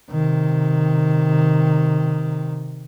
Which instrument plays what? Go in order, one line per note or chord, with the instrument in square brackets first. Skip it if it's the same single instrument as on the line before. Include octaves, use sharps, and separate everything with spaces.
[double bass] C3 D#3